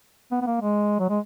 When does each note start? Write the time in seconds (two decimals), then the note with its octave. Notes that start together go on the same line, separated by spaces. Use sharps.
0.31 B3
0.42 B3
0.47 A#3
0.61 G#3
1.00 F#3
1.10 G#3